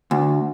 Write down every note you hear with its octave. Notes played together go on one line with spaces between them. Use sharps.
D2